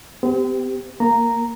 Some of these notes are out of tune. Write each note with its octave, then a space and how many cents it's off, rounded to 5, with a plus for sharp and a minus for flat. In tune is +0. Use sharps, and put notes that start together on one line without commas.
C4 -45 G4 +0
A#3 -10 A#5 -5